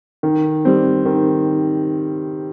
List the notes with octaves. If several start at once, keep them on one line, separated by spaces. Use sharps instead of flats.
D#3
G3 C4
D#3